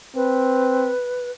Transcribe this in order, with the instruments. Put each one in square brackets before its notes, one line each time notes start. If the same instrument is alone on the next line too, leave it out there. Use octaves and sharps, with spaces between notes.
[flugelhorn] C4 [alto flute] B4